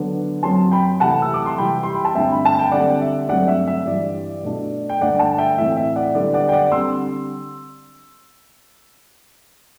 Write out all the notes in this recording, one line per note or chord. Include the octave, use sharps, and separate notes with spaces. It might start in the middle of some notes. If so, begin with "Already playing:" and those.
Already playing: D3 F#3 B3 D4
F#2 F#3 C4 A5 C6
G5 B5
C3 E3 A3 F#5 A5
E6
D6
C6
C3 E3 G3 G5 B5
C6
B5
A5
G2 D3 A3 C4 E5 G5
B5
A5
G5
D3 G3 C4 D5 F#5
E5
G2 D3 F#3 A3 C4 D5 F#5
E5
E5
G2 E3 G3 D5
B2 A3 D4
G5
G2 D3 A3 D4 D5 F#5
F#5 A5
E5 G5
A2 E3 A3 C4 E5
E5
D5 F#5
D3 G3 B3 D4 D5
D5 F#5
G5
D5 F#5
D3 G3 C4 C6 E6